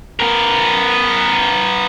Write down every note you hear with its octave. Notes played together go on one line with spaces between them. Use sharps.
B3 A#4